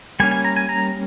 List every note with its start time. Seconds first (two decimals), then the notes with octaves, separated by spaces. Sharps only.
0.20 G3 A#3 C#4 G#5
0.31 G#5
0.45 A#5
0.56 G#5
0.69 A#5